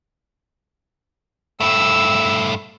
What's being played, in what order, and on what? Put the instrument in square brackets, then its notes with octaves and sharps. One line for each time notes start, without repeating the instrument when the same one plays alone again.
[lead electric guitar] G2 A3 [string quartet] E6